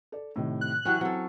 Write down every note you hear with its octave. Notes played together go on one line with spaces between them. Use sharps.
A4 D5
A2 C3 D#3
F#6
E3 F#3 C#4 G4 G5
F#3 C4 A4